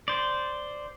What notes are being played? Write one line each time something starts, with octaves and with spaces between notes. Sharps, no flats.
C5 D5